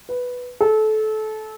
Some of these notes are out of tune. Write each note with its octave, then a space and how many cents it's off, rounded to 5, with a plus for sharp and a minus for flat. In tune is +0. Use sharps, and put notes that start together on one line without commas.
B4 +0
A4 -25